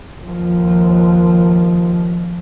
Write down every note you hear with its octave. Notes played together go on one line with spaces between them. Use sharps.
D#2 F3